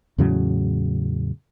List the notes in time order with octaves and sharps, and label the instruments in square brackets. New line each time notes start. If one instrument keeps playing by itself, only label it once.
[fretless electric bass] E2 A2 C#3 F#3